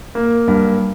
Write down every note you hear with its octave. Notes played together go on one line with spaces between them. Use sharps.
A#3
G2